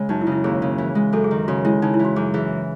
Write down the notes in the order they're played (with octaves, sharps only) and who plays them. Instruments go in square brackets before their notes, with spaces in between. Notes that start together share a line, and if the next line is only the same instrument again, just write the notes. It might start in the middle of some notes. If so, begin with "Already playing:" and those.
Already playing: [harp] C#3 G#3
[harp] F#2 [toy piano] D#4
[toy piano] E4
[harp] C#3
[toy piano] E4
[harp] D#2 [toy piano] G#4
[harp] C#3
E3
G#3
[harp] F#2 [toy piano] A4
[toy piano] G#4
[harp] D#3
[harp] C#3 [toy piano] F#4
[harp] G#3 [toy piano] E4
[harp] C#3 [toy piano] D#4
[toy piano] E4
[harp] E3
[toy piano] F#4
[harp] F#2 [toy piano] G#4
[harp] E3 [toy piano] G#4